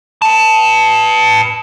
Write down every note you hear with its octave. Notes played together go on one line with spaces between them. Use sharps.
B4 A5